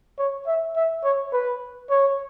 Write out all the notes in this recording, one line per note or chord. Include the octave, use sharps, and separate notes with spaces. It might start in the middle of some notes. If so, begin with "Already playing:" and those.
C#5
E5
E5
C#5
B4
C#5